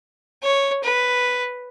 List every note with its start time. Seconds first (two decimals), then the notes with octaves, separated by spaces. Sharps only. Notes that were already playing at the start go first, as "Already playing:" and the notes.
0.43 C#5
0.84 B4